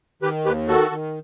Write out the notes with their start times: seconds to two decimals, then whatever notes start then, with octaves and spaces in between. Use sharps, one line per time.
0.22 D#3 G4 B4
0.45 D#2 G4 B4
0.68 D#3 F#4 A4
0.91 D#3